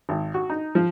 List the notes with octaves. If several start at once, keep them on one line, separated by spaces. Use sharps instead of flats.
G#1
F#4
D#4
F3